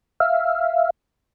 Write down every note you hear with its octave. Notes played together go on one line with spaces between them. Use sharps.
E5 F5